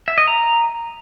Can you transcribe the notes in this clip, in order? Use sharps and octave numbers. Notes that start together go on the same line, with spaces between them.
E5
D#5
A#5